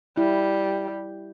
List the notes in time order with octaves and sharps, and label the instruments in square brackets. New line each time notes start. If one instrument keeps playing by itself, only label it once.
[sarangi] G3 [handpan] E4